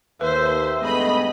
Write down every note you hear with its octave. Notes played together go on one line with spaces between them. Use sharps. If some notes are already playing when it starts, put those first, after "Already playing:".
D#2 B4 C5 E5
G2 G#3 A3 B3 D#5 B5